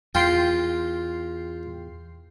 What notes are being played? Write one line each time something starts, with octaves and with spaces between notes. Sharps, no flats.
E2 F4 G5 C6 C7